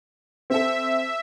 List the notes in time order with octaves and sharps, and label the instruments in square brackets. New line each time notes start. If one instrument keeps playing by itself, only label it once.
[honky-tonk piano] C4 A4 [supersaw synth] E5